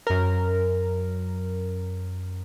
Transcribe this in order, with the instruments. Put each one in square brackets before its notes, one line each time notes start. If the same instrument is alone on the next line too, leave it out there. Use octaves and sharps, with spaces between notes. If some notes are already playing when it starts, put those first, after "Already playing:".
[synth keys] F#2 A#4